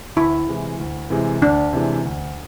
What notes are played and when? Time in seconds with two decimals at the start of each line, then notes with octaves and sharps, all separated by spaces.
0.16 D2 E4
0.47 C3 E3 G#3
0.79 D2
1.10 C3 E3 G#3
1.41 D2 D4
1.73 C3 E3 G#3
2.05 D2